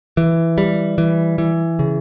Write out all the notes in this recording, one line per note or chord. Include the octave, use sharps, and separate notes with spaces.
E3
G3
E3
E3
C#3